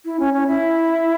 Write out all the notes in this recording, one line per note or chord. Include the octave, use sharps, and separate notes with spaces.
E4
C#4
C#4
E4